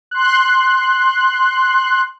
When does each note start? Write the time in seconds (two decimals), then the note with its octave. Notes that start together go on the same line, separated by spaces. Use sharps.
0.11 C6 F#6